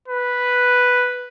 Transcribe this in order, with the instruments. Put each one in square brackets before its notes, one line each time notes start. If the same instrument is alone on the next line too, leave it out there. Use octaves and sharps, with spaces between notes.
[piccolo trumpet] B4